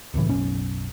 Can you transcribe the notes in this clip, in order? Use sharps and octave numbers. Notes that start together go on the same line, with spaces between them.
D1 C#2 A2 E3
F#1 B1 C#4